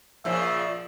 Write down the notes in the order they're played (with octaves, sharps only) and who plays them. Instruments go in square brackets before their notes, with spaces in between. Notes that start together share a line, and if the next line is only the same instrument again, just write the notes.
[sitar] A#2 C#3 F3 [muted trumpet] E5